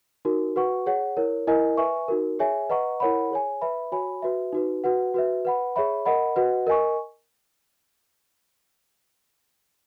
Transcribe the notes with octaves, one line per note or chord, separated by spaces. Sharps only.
D#4 F#4 A#4
F#4 B4 F#5 C#6
G#4 C#5 F#5
E4 A#4 C#5
E4 A#4 D#5 G#5
B4 E5 G#5 C#6
D#4 F#4 A#4
G#4 C#5 E5 G#5
B4 D#5 F#5 A#5 C#6
E4 A#4 C#5 F#5 B5
G#4 C#5 G#5
B4 E5 B5
F#4 C#5 G#5 B5
F#4 B4 E5
D#4 F#4 B4
F#4 B4 F#5
F#4 B4 E5
B4 F#5 B5
G#4 C#5 E5 B5
A#4 D#5 F#5 B5
F#4 B4 D#5 F#5
A#4 D#5 G#5 C#6